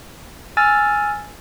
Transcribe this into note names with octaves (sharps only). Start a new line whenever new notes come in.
G#5 E6 F6 A6